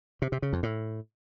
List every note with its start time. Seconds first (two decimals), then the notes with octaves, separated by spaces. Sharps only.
0.22 C3
0.32 C3
0.42 C#3
0.53 F2
0.63 A2